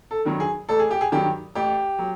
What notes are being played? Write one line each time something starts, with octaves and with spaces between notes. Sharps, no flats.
A4
G2 D#3 F#3
G#4
A1 A4
G#4
G4
G#4
G2 D#3 F#3 G4
A1 G4
F#3